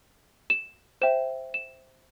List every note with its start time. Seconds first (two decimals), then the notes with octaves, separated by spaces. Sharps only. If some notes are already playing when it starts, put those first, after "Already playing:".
0.50 E7
1.01 C5 E5 G5 E7
1.54 E7